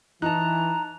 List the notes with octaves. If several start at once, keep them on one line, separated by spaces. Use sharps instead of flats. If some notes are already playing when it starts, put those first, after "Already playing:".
E3 D#4 A5 A#5 F#6